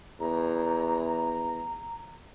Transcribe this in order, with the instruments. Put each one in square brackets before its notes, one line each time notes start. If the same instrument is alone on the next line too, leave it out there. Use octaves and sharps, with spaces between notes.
[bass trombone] E2 [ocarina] A#5